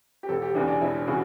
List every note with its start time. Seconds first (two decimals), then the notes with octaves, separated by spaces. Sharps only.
0.23 G4
0.29 E1 A4
0.42 G4
0.55 E2 C#3 E3 D4
0.68 D4
0.82 E1 E4
1.07 C#3 E3 F#4